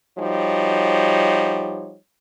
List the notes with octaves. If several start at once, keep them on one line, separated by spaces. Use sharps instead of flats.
F3 G3 D#4 F#4 C#5